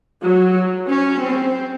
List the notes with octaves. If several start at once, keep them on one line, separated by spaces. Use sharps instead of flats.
F#3
C#4
C4